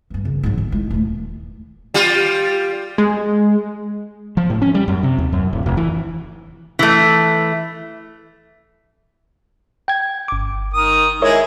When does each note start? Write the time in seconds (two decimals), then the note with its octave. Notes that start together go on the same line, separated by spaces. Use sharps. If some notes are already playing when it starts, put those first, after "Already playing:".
0.10 G2 E3
0.25 F#2 C#3
0.43 G#2 F#3
0.58 D3
0.72 G#3 E4
0.90 D#1 A3
1.94 G3 F4
2.98 G#3
4.37 F3
4.50 A2
4.62 C#4
4.74 G3
4.88 F#2
5.03 C3
5.18 D#2
5.33 F#2
5.53 D1
5.66 F1
5.77 E3
6.79 E3 A3
9.88 G5 G#6
10.28 G1 D6
10.74 D#3 A#4 D#6
11.22 G#3 E4 G#4 A#4 C#5 E5